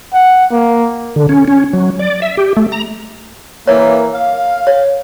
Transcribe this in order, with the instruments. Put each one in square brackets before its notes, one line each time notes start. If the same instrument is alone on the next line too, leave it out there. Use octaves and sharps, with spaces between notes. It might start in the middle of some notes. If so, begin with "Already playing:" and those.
[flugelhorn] F#5
A#3
[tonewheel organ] D3
C#4
C#4
F#3
D5
E5
G4
A3
A#5
[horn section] E3 A#3 [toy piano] C#5
[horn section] F5
[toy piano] C#5